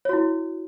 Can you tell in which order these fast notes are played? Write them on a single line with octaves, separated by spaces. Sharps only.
C#5 F#4 E4